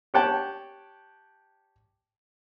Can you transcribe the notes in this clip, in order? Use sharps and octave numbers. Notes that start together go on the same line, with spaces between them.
G4 C#5 F#5 G5 A5